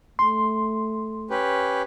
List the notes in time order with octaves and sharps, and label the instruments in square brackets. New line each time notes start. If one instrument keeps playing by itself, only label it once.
[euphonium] A3 [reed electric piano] C6
[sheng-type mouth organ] C#4 G4 B4